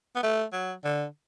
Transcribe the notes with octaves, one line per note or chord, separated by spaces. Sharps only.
B3
A3
F#3
D3